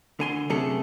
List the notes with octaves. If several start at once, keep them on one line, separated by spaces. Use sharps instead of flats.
D3 G#5 C6
F#2 C3 F#3 A3 G#4 A4